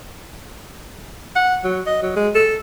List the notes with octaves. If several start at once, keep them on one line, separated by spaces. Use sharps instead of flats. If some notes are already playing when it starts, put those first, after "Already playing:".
F#5
F#3
D#5
F#3
G#3
A4